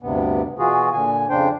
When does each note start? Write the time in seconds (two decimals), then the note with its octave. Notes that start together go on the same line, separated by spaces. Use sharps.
0.02 D2 G2 C3 B3
0.59 B2 E3 F4 F#4 G#4
0.93 A#2 D3 G#5
1.29 F2 C#3 D4 C5 G5